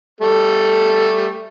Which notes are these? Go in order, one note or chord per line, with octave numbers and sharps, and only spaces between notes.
G3 A3 A4